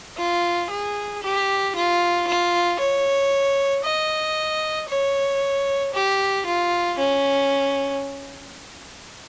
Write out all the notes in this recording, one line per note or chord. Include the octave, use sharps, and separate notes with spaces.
F4
G#4
G4
F4
F4
C#5
D#5
C#5
G4
F4
C#4